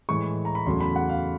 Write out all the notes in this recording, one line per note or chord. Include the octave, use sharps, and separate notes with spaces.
A2 E3 G#3 C#6
A#5
B5
E2 C#3 F#3 A3 C6
B5
F#5
F5